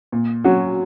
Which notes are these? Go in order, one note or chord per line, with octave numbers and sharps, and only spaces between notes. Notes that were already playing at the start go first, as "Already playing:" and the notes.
A#2
F#3 C#4 F#4